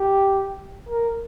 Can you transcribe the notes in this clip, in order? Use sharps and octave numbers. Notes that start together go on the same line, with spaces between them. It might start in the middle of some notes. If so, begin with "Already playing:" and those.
Already playing: G4
A#4